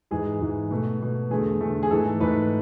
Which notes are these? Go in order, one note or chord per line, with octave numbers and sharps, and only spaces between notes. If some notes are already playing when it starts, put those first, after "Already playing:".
G#2 E3 G#3 G#4
G#2 E3 G#3
B2 A3
B2 A3
E2 D3 A3 G#4
E2 D3 A3
G#4
G#2 E3 A3 A4
G#2 E3 A3 B4